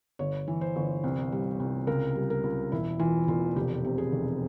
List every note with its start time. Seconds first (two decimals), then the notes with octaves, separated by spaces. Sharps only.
0.19 G1 C#5
0.48 E3
0.61 C5
0.76 G1
1.04 C2
1.32 G3
1.60 C2
1.87 C#2 A#4
2.15 G3
2.30 A#4
2.44 C#2
2.72 E1 E4
2.99 E3 F4
3.28 E1 F4
3.56 F1 G4
3.85 C3
3.98 G#4
4.12 F1